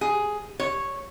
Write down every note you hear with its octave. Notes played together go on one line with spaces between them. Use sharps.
G#4
C#5